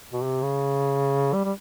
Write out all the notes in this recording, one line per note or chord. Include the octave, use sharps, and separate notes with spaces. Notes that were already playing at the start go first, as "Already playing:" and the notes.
B2
C3
C#3
G3
G3